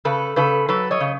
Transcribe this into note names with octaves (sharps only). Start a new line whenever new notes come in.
C#3 A4 B4
C#3 A4 B4
F#3 A4 B4
C#5 D#5
C#3